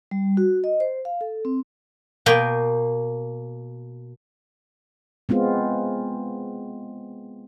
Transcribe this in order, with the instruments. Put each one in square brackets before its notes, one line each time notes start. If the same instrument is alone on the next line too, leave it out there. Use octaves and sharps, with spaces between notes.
[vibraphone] G3
F#4
D#5
C5
F5
A4
C4
[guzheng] B2 A#3 G5
[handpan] G#3 B3 C4 F4